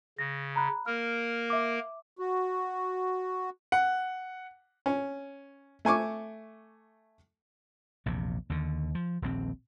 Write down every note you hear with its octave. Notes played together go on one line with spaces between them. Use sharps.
C#3 A#6
A#5 B5 F#6
A#3 A#4 F6
E5 D6
F#4
F#5
C#4
A3 G#5 C#6 D6
A#1 E2 C3
D#2 D3
F3
D#1 A#1 C4